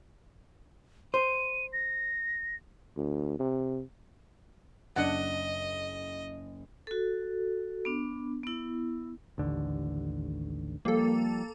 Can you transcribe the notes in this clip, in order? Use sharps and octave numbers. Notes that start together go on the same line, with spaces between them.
C5 D#7
A#6
D2
C3
F#1 D4 D#5 F#5
F#4 A4
B3 D4
B3 E4
A1 D#2 D3
F3 G3 A#3 A4